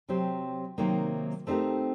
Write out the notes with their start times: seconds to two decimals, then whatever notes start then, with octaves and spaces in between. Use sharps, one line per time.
0.09 C3 F#3 C4 G4 C5
0.78 C3 D#3 F#3 A#3 D#4
1.47 A3 C4 D#4 G4 A#4